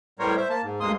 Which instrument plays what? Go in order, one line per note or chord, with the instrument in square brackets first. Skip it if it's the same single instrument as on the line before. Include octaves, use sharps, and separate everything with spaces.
[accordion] A2 G3 B3 A#4 C5 C#5
C5 E5
A#3 A5
G#2
D2 G2 G#3 A#3 C6 D#6